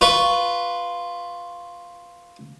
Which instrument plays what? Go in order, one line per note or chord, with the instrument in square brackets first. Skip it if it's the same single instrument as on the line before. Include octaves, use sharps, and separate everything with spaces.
[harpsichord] F4 B4 C#6